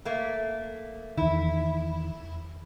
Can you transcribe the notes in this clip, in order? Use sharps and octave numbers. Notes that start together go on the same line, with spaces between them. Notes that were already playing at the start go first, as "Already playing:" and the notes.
A3 A#3
E2 D#3 E4